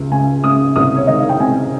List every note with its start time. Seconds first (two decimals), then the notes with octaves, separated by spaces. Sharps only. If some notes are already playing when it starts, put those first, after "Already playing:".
Already playing: C#2
0.11 C#3 G#5
0.44 C#3 D#6
0.76 C2 D#6
0.96 C#5
1.07 D#3 D#5
1.18 F5
1.29 G5
1.40 C3 G#5